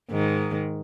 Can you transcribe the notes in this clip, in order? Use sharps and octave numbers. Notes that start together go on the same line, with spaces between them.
G#2 D#3